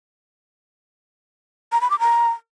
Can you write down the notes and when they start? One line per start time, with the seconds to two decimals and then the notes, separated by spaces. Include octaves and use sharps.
1.72 A#5
1.81 B5
1.90 D6
1.99 A#5